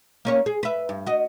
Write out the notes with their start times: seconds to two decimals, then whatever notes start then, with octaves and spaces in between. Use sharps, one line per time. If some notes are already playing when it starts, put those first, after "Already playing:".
0.25 A#3 C#4 C#5
0.46 G#4
0.63 B4 E5
0.89 G2
1.06 F#4 D#5